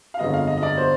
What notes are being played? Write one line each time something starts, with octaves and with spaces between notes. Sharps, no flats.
F5
G1 F2 D3 G#3 B3 D#5
F5
D#5
D#5
D5
C5